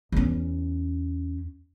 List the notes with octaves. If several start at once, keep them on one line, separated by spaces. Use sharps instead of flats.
E2 C#4